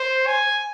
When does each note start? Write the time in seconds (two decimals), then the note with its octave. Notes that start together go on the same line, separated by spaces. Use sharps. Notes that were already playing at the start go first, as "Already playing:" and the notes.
Already playing: C5
0.27 G#5